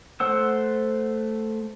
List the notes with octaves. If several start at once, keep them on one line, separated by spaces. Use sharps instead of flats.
A3 C5 F#5 E6